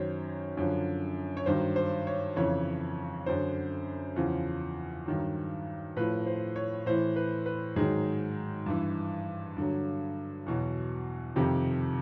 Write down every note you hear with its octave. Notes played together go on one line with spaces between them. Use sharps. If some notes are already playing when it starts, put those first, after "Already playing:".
Already playing: F#2 D#3 F#3 C5 C#5
F#2 D3 F3
C#5
G2 D#3 F#3 C5
C5
C#5
F2 C#3 E3 C#5
F#2 D3 F#3 C5
E2 C#3 F3
G2 D#3 F#3
A2 F3 B4
C5
C#5
A2 E3 C5
B4
B4
G#2 D#3 F#3 G#4
G2 E3
G2 D3 F#3
E2 B2 F#3
F2 C3 D#3 G4